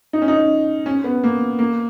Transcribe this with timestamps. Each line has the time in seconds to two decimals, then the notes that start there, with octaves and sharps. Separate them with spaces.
0.13 D#4
0.22 C#4
0.28 D#4
0.86 C#4
1.04 B3
1.24 A#3
1.59 A#3